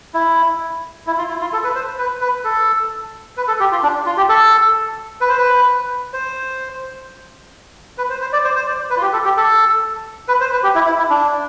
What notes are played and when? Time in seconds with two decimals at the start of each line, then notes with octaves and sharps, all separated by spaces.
0.14 E4
1.07 E4
1.18 F4
1.30 E4
1.41 F4
1.53 A4
1.64 B4
1.75 C5
1.99 B4
2.21 B4
2.44 A4
3.37 B4
3.48 A4
3.60 G4
3.72 F4
3.83 D4
4.06 F4
4.17 G4
4.29 A4
5.21 B4
5.29 C5
5.38 B4
6.13 C5
7.98 B4
8.10 C5
8.21 C5
8.33 D5
8.44 C5
8.55 C5
8.67 D5
8.90 B4
8.97 F4
9.02 G4
9.13 A4
9.24 G4
9.37 A4
10.28 B4
10.40 C5
10.52 B4
10.63 G4
10.75 E4
10.86 E4
10.98 E4
11.10 D4